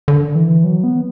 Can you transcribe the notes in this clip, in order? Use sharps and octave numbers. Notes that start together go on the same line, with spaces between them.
D3
E3
F#3
B3